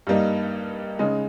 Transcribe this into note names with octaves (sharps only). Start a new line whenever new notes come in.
G2 G3 A#3 D#4
C#3 G#3 D#4